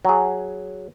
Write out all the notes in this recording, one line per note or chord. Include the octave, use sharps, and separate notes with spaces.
F#3 G#4